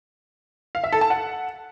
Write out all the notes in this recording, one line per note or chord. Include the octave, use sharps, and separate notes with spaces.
F5
E5
A4
A5
F#5